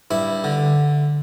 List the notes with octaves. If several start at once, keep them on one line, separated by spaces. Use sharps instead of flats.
G2 E4
D3